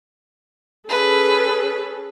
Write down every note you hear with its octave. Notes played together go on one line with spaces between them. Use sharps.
C#4 G#4 A4 B4